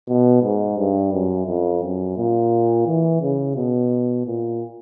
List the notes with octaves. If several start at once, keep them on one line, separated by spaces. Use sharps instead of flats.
B2
G#2
G2
F#2
F2
F#2
A#2
E3
C#3
B2
A#2